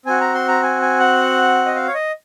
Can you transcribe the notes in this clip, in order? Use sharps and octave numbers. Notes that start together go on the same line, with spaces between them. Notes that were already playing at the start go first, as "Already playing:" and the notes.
C4 F#4 G#5
A#5
C6
A#5
G#5
G#5
F#5
D#5
F5
C#5
D#5